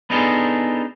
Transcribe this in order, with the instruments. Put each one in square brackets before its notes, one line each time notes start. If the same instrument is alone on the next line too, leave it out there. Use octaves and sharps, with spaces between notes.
[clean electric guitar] B3 D4 D#4 F4 G#4 A4